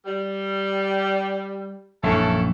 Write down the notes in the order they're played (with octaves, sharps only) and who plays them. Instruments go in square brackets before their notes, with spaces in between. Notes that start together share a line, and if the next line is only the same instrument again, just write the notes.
[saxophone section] G3
[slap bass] A#1 F#2 [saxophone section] C#4 E4 A4